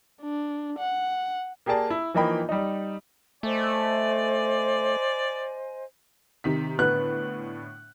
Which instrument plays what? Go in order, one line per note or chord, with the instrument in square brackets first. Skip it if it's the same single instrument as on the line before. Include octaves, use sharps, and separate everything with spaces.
[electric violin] D4
F#5
[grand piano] A#3 G4 G#4 D5 A5 A#5
E4
E3 F3 A#3 D#4 G5 B5
G3 D#4
[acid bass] A3 [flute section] C5 D#5 G#5 [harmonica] D5
[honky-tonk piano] C3 D#3 B6
[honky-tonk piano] A2 D3 [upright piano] B3 F#6